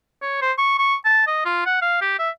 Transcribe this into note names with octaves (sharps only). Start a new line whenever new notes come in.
C#5
C5
C#6
C#6
A5
D#5
F4
F#5
F5
G4
E5